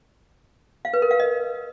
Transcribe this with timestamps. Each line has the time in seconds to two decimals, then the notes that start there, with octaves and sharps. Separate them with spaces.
0.85 F5
0.93 B4
1.02 A#4
1.11 F5
1.20 D#5